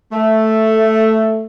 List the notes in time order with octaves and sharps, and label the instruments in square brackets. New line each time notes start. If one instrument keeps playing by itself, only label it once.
[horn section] A3